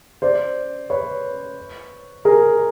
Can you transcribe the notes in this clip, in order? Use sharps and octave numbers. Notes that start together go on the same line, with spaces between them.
C5 D5
B4 C#5
G#4 A#4